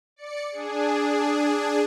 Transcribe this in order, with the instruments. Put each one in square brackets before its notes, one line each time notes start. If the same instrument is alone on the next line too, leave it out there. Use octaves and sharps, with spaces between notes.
[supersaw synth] D5 C#7
D4 G#4